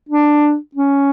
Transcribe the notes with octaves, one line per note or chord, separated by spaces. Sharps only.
D4
C#4